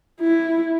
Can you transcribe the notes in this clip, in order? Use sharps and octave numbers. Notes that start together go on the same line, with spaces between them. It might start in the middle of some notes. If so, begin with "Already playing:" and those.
E4